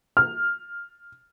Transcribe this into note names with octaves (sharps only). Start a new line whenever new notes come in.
F6